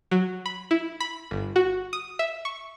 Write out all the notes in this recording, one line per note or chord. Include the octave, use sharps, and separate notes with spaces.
F#3
B5
E4
B5
G1
F#4
D#6
E5
C#6